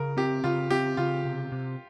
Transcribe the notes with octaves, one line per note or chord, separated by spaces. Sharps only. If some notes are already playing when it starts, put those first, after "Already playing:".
Already playing: C#3 A#4
C4 G4
C#3 F4
C4 G4
C#3 F4
C3
C3